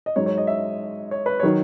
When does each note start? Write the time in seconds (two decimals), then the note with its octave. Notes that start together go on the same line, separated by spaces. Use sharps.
0.06 D#5
0.16 G#2 F#3 C#5
0.26 C#5
0.38 D#5
0.47 E5
1.11 C#5
1.26 B4
1.40 D#3 F#3 C#5